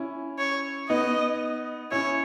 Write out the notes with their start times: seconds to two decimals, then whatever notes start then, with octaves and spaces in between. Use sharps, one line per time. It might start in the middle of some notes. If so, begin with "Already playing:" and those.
Already playing: C#4 E4
0.39 C#5
0.89 B3 D#4 D#5
1.92 C#4 E4 C#5